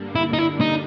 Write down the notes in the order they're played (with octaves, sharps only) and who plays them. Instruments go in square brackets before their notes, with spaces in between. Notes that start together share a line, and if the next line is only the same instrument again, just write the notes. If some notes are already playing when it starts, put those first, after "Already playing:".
Already playing: [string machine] G2 D3 G3 A#3 D4
[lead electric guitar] E4
D#4
E4
D#4